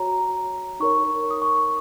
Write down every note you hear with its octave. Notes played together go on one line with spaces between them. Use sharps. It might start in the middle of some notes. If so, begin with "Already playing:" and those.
Already playing: F#4 C#5 A#5
D#4 A#4 C#5 C#6
D#6
C#6